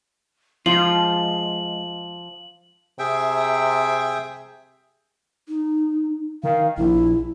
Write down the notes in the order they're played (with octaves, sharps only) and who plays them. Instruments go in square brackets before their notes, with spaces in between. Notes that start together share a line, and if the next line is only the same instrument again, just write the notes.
[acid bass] F3 [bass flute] G#3 [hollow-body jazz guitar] F4 [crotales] F#7
[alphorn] C3 [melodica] G#4 E5 G5
[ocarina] D#4
[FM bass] D#3 [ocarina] F5
[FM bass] A#1 [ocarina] E4